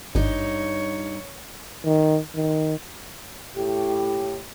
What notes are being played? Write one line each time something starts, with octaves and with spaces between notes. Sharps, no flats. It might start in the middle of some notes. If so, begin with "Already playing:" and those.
G#1 G2 D#4 C#5
D#3
D#3
A2 G4